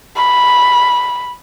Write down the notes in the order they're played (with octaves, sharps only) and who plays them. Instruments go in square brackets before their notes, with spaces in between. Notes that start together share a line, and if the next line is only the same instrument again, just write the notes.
[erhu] B5